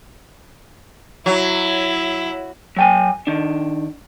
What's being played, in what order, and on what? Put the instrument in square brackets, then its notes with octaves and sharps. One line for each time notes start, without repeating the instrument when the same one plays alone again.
[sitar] F#3 [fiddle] E4
[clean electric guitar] F#3 G5 G#5
D#3 D4